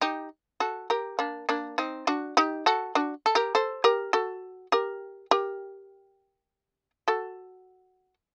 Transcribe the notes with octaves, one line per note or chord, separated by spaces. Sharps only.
D#4 G4
F#4 A4
G4 A#4
A#3 D4
A#3 D4
C4 D#4
D4 F#4
D#4 G4
F#4 A4
D4 F#4
A4
G4 A#4
A4 C5
G4 A#4
F#4 A4
G4 A#4
G4 A#4
F#4 A4